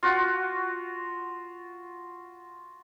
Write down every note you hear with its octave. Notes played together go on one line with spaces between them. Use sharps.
F4 F#4